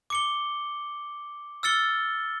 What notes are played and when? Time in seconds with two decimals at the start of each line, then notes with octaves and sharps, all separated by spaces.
0.10 D6 C#7 G7
1.63 E6 F6 A6 C#7 G7